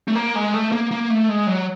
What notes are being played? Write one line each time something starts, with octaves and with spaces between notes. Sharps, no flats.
A3
A#3
G#3
A3
A#3
A#3
A3
G#3
F#3